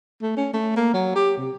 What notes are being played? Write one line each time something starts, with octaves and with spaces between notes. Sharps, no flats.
A3
C#4
A3
A#3
F#3
G4
C3